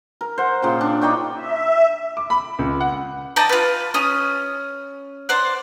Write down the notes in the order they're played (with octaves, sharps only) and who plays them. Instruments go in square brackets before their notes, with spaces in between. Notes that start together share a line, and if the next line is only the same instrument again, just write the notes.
[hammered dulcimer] A#4
C5 F#5
A#2 C#3 G5
D4
D#4 D5 G5 C#6
[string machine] E5
[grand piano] D6
B5
C#2
F#5
[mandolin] D5 D#5 G5 A5
F4 B4
C#4 D#6
C5 D5 F#5